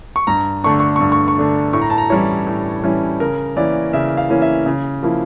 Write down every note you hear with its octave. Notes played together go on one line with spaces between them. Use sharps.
C#6
G2 A#5
D3 A3 D4 C#6
C#6
C#6
G2
C#6
C#6
D3 A3 D4
A2 C#6
A#5
A5
A#5
E3 G3 C#4 E4 C#5
A2
E3 G3 C#4 E4
C#3 A#4
E3 A#3 C#4 E4 D5
C#3 E5
F5
E3 A#3 C#4 E4
E5
C#3
F3 A#3 E4